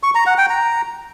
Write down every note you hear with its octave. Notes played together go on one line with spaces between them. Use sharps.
C#6
A#5
F#5
G5
A#5